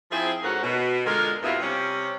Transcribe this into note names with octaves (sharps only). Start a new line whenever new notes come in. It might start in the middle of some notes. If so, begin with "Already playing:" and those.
F3 C4 D#4 E4 G#4
G#2 C#4 F#4 A4 A#4 F#5
B2
D3 G#3 F4 A4 A#4
G2 B2 B3 C4 E4 F4
C3 G3 C#4